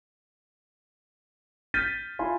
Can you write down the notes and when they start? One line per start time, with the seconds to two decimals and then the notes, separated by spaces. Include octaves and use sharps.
1.74 F6 G6 A6 B6 D#7
2.19 E4 F4 G#5 C6